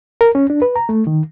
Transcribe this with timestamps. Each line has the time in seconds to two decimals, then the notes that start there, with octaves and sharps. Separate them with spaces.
0.21 A#4
0.35 C#4
0.50 D4
0.62 B4
0.76 A#5
0.89 A3
1.07 D#3